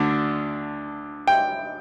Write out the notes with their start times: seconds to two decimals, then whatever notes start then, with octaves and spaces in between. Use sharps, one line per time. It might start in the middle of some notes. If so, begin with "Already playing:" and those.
Already playing: D2 D3 D4
1.28 G5